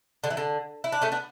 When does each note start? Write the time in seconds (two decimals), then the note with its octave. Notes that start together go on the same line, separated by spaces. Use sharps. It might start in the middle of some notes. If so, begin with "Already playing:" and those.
0.24 D3
0.30 E3
0.37 D3
0.84 E4
0.92 D4
1.02 A3 C#4
1.12 B3 D4